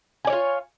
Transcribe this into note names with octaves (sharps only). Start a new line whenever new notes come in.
F4 C#5 D5 G#5